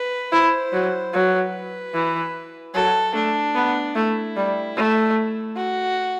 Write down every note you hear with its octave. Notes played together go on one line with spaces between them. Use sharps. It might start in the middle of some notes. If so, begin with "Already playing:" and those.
Already playing: B4
E4 C5
F#3
F#3 B4
E3
F#3 A4
A3 D4
B3
A3 E4
G3
A3
F#4